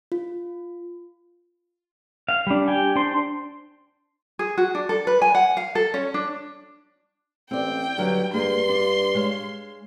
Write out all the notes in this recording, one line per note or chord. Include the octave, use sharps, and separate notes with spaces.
F4
F5
G3 D4
G4 G5 G#5
D4 C5 C6
G#4
F#4
D4
A4
B4
G#5
F#5
F5
A4
C#4
D4
A1 C4 D5 G5
G2 D3 F#3 F5
G2 A#3 G#4 C6
D4
G#3 C#5 F5